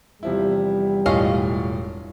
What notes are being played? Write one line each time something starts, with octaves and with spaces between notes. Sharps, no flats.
E2 C3 F3 G3 E4
E1 A2 C#4 F4 D#5 F5